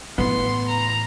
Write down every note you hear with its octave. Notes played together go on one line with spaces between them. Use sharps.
A2 E3 B3 C6
A#5